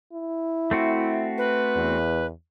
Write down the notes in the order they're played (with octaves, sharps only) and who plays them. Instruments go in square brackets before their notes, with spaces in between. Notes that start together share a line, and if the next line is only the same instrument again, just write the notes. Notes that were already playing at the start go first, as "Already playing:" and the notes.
[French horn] E4
[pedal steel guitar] A3 C4 F#4
[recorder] B4
[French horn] E2